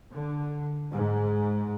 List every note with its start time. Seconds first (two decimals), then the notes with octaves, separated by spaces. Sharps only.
0.13 D3
0.93 G#2